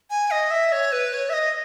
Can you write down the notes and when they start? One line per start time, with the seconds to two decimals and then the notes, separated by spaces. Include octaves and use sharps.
0.10 G#5
0.31 D#5
0.51 E5
0.72 C#5
0.92 B4
1.13 C#5
1.29 E5
1.33 D#5